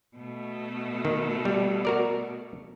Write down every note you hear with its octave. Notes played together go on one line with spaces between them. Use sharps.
B2 A3
D#3
G3
F#4 A#4 D5